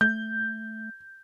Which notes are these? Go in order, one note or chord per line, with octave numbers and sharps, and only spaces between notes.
A3 G6